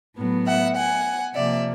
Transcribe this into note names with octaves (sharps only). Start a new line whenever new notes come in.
A2 F#3 B3
E5 F#5
F#5 G#5
C3 F3 A#3 D5 E5